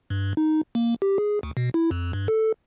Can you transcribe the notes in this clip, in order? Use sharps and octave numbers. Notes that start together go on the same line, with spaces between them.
G2
D#4
A#3
G4
G#4
D2
B2
E4
F2
G2
A4